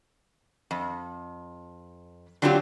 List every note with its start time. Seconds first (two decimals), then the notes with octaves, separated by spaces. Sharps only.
0.71 F2
2.42 D3 F#3 C4 D4 F4 G4